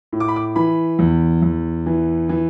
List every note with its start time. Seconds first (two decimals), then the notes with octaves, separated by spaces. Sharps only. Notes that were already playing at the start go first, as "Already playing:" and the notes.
0.13 A2
0.20 D6
0.28 B5
0.36 D6
0.56 E3 B5
0.99 E2
1.42 E2
1.86 E3
2.29 E3